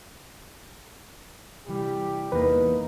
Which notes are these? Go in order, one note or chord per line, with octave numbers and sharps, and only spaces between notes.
C2 E3 G3 G4
E2 A#3 D#4 B4